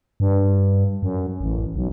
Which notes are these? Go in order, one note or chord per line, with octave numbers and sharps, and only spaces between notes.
G2
F#2
A1
B1